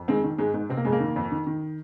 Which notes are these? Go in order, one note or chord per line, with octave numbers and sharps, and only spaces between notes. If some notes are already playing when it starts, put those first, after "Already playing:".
Already playing: F2
D#3 G#3 C4
D#3
G#2 G#3
G#2
C3 C4
A#3
F2 G#3
A#3
D#3
F2
D#3
D#3